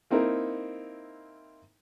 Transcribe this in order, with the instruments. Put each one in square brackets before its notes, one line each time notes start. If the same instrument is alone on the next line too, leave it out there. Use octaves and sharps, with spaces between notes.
[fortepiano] A#3 C4 D#4 E4 A#4